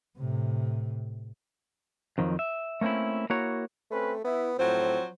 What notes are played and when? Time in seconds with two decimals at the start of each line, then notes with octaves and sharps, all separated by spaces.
0.18 A2 C3
2.18 F2 D#3 F3 F#3
2.39 E5
2.81 A3 A#3 C4 C#4 E4
3.30 A#3 E4 F#4 C#5 A#5
3.91 A3 C4 C#4 B4
4.24 B3 E4
4.58 A2 F3 F#3 C4 C5